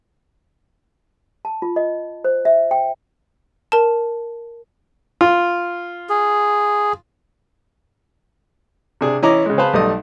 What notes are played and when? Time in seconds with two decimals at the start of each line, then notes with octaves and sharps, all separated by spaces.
1.45 A5
1.62 F4
1.76 D#5
2.25 C5
2.45 E5
2.71 G5
3.72 A#4 A5
5.21 F4
6.10 G#4
9.01 C3 D4 G#4
9.22 E3 C#4 E4 D#5 A#5 D6
9.46 C#3 G#3
9.58 G#4 B4 C5 F5 A5 B5
9.73 B1 G3 A3 D#5 D#6